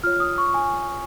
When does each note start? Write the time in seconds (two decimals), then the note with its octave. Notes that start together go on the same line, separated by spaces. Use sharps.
0.03 F4 C#5 F6
0.20 D#6
0.38 C#6
0.54 G#5